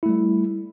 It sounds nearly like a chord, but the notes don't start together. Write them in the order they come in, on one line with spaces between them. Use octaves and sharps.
E4 A3 G3